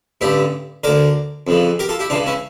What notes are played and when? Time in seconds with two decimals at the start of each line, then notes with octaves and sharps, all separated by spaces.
0.21 A1 G2 D3 E4 G4
0.84 D2 D3 A#4 D5
1.47 F2 C#3 E3
1.79 G4 A#4
1.89 F4 A4
1.99 E4 G4
2.10 C#2 C#3 E3 D4 F4
2.26 C#4 E4